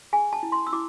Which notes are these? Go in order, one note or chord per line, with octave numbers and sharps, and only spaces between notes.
G#4 G#5
A5
E4
C6
E6
E4 D6